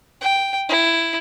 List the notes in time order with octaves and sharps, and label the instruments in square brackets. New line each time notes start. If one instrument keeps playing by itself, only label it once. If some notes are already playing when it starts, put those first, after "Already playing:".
[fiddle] G5
E4